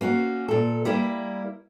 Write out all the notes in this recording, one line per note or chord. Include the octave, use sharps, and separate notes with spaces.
A#3 C#4 F#4
A#2 A4
G3 A#3 E4